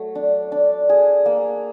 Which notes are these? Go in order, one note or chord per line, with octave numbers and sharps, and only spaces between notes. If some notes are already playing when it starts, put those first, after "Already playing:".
Already playing: F#3 A3
D4
D4
G#4
A#3